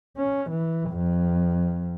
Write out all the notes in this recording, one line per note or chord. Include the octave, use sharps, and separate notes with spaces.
C#4
E3
F2